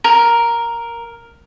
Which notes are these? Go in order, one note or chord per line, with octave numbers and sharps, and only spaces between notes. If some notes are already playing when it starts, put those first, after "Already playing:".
A#4